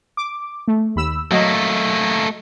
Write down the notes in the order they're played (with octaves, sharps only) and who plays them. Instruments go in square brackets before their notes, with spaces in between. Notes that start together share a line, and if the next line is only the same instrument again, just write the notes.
[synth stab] D6
A3
D#2 B5 E6
[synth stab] F#3 D#5 [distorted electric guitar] A3 A#3